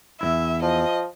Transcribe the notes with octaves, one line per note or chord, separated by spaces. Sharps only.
E2 G2 E4 E5
F3 D#5